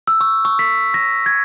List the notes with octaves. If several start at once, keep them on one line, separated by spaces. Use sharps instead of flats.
E6
C#6
C#6
B6
A#6
G#6